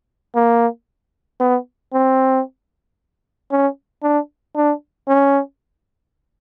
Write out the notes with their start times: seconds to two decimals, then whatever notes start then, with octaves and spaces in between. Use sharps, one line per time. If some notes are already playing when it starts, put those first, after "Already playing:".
0.35 A#3
1.40 B3
1.93 C4
3.51 C#4
4.03 D4
4.56 D4
5.08 C#4